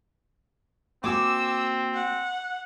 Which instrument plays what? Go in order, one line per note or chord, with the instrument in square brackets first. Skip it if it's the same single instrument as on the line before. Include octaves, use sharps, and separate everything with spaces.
[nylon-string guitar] A#3 F#4 G5 [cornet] C4 [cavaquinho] G#5 D6 [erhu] E6
[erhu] F#5